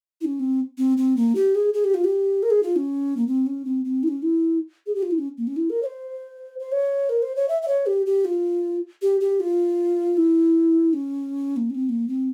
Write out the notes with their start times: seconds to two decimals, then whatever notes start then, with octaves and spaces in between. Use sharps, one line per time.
0.21 E4
0.25 C#4
0.40 C4
0.78 C4
0.97 C4
1.17 A#3
1.35 G4
1.55 G#4
1.74 G#4
1.84 G4
1.94 F4
2.04 G4
2.43 A#4
2.50 G#4
2.63 F4
2.76 C#4
3.17 A#3
3.27 C4
3.46 C#4
3.65 C4
3.85 C4
4.03 E4
4.08 C#4
4.23 E4
4.87 G#4
4.95 G4
5.03 F4
5.11 E4
5.18 C#4
5.38 A#3
5.47 C#4
5.56 E4
5.70 A#4
5.83 C#5
5.86 C5
6.59 C5
6.72 C#5
7.09 A#4
7.22 C5
7.36 C#5
7.48 E5
7.62 E5
7.68 C#5
7.86 G4
8.06 G4
8.25 F4
9.02 G4
9.21 G4
9.40 F4
10.17 E4
10.93 C#4
11.57 A#3
11.70 C#4
11.75 C4
11.89 A#3
12.08 C4